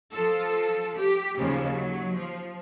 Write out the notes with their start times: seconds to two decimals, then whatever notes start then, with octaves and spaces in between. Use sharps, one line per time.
0.12 F3 F4 A4
0.96 G4
1.37 D#2 C#3 F3
1.73 F#3
2.12 F3